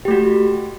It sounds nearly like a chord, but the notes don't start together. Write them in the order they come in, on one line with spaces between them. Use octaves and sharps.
G4 A3 F#4